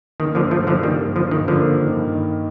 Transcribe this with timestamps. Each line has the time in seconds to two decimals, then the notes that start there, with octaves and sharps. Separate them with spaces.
0.20 D#3 A#3
0.35 G2 D3 F3
0.51 D#3 F3 A3
0.67 D3 F3 A#3
0.83 D#3 G3 A#3
0.99 G2
1.16 G2 D3 F3
1.31 G2 D#3
1.48 D3 F3 A#3
1.64 G2
1.80 D#3
1.96 G2
2.12 D#3